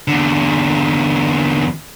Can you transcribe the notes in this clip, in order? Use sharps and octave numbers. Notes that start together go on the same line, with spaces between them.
E2 D3